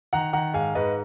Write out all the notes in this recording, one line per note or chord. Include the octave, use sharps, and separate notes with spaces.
D#3 F#5 A#5
D#3 F#5 A#5
G#2 F5 G#5
G#2 B4 D#5